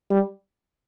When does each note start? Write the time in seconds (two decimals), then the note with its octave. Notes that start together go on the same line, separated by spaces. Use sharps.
0.10 G3